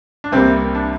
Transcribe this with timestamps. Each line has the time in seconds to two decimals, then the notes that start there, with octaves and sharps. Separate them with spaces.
0.24 D4
0.32 C2 C3 G3 A#3 C4
0.75 D4